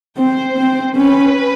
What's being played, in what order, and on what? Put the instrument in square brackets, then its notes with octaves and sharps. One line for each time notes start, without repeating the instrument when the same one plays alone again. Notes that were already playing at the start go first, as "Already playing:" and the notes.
[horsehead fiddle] C4 [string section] C5
[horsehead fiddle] C4
[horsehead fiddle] C#4 [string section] B4